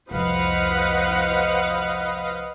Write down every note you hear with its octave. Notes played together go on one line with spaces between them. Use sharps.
C2 F2 B4 C5 D#5 F5 F#5